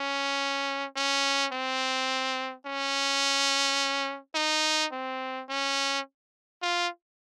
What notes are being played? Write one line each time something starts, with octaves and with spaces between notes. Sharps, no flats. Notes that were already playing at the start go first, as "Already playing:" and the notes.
Already playing: C#4
C#4
C4
C#4
D#4
C4
C#4
F4